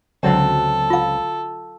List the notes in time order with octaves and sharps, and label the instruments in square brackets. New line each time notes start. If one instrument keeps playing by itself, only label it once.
[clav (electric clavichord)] C#2 C4 [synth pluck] D3 F#3 [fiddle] A4
[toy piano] F4 F5